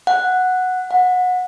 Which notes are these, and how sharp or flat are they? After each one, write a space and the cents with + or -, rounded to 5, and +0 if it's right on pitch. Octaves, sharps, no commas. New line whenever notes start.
F#5 -5
F#5 -25